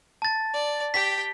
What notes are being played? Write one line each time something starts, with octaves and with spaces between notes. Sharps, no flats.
A5 A6
D5
G4 G5 B6